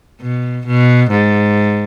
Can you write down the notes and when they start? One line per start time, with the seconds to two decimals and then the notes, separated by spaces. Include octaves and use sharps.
0.22 B2
0.67 B2
1.11 G#2